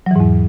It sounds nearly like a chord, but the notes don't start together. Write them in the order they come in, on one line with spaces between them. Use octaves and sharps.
F#3 E3 G#2 E2